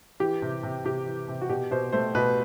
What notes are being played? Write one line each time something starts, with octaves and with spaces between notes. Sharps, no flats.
E3 G4
C3
C3
C3 G4
E3
C3
F#4
B2 G4
B2 C5
A3 C5
B2 B4